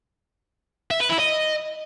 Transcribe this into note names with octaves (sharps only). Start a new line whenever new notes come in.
E5
B4
E4
D#5